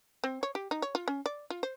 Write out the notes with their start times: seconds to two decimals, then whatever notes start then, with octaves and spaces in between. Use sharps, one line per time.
0.24 C4
0.43 C#5
0.55 G4
0.71 D#4
0.82 C#5
0.95 F4
1.08 C#4
1.26 D5
1.50 F4
1.63 C5